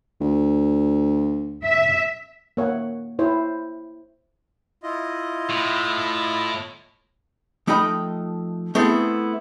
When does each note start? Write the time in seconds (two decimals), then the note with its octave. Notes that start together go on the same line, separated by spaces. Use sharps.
0.21 D2
1.64 E5
2.57 A#3 C#5 E5 F#5
3.19 E4 C5 C#5
4.83 E4 F4 D#5
5.50 A2
7.67 F3 A3 D#4 D#5 G5 B5
8.75 A3 B3 C4 E4 G#4 A4